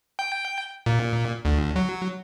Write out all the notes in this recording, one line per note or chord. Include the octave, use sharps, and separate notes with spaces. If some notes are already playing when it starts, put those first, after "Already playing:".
G5
A#2
D2
F#3